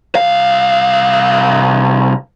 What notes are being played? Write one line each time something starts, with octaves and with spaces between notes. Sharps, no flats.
C2 F5